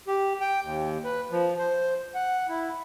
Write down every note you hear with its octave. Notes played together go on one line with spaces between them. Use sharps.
G4
G5
D#2
B4
F3
C5
F#5
E4